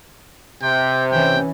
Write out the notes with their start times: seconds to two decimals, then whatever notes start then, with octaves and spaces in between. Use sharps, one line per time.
0.62 C3 G5
1.11 E3 C#4 G5